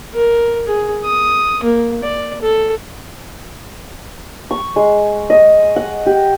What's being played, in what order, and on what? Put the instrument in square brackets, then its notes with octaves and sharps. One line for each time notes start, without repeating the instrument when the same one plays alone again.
[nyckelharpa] A#4
G#4
D#6
A#3
D5
A4
[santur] C#6
G#3
D#5
F#5
G4